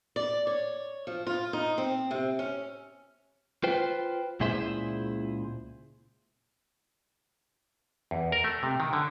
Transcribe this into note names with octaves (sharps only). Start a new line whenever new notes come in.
D5
C#5
F3
F4
D#4
C4
C3
C#4
F4 B4 C5 G5
C#2 A#2 E4 G#4 C5 E5
E2
A#4
A3
C3
D#3
D3